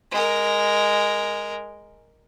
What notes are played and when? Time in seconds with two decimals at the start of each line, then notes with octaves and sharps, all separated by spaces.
0.11 G#3 A#4